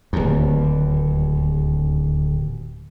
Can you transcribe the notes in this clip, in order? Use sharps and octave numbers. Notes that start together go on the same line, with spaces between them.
D1 D#2